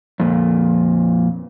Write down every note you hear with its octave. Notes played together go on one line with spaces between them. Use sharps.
F2 A#2